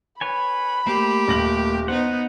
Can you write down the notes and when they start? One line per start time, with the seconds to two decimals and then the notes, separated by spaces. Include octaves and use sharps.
0.21 B4 C#5 G#5 B5
0.87 A3 A#3 G4 C5
1.28 D#1 A#6 F#7
1.88 B3 D#4 C5 F#5